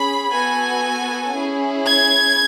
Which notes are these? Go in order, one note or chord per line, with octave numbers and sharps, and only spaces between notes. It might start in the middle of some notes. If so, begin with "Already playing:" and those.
Already playing: C#4 G#4 B5
B3 F#4 A4 G#5
C#4 E4 G#4
G#6